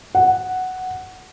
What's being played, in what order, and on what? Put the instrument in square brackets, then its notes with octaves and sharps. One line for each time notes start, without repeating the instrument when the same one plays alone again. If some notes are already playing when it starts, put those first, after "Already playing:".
[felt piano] F#5